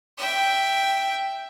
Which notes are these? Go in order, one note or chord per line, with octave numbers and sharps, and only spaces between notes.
E5 G5